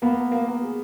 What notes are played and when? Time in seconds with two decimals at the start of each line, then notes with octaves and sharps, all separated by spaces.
0.02 A#3 B3
0.17 A#3
0.31 A#3
0.47 A#3
0.62 G#4